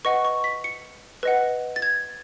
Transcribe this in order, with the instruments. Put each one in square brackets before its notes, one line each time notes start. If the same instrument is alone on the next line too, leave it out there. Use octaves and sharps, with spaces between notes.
[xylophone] B4 D#5 F#5 C#6
C#6
B6
C#7
B4 D#5 F#5
A6
G#6